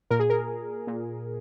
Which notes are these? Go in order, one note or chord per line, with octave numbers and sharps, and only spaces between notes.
A#2 A#4
G#4
A#4
A#2